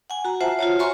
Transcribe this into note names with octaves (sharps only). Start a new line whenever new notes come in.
F#5 G#5
F#4 A#5
F4 C5 E5 F#5 A5
F4 F#4 C#5
C#5 E5 G#5 A#5 C6 C#6